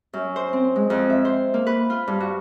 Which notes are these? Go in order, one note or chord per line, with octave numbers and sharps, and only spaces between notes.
F#2
C5
C4
G#3
F2
E5
C5
A#3
B4
F4
G2
F#4